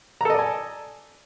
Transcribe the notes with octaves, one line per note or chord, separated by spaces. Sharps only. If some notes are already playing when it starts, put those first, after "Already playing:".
A4 D5 D#5 G#5 A#5